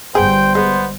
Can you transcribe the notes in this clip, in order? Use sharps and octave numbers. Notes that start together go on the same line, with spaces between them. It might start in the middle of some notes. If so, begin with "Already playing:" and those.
G1 G3 B3 G#4 C5 G5
G#3 B3